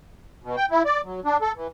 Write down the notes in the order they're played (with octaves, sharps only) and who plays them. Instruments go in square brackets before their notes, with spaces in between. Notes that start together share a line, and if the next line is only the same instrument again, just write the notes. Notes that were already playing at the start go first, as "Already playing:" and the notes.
[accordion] B2
G5
E4
D5
F#3
D4
A4
E3